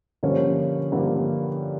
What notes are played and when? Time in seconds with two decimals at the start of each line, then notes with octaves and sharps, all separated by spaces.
0.23 G2 D3 F3 A#3 C#4
0.92 G2 D3 F3 A#3 C#4